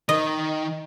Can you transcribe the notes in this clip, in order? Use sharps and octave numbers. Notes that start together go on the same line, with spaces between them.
D#3 D#5